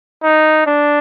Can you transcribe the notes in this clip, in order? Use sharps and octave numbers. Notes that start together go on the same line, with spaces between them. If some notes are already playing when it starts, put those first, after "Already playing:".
D#4
D4